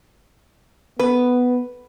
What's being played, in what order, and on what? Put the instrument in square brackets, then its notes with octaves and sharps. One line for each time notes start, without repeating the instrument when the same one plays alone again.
[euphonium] B3 [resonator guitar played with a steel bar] B4